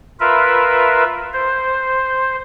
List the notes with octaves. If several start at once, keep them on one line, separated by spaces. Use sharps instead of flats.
F4 A#4 B4 E5
C5